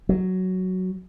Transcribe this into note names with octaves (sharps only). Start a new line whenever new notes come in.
F#3